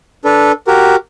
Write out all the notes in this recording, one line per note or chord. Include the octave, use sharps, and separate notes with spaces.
D4 A4 B4
F#4 G4 A#4